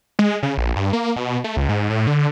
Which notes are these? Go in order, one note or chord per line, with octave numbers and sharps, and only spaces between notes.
G#3
C#3
A#1
G2
A#3
B2
A3
C#2
G#2
A2
D3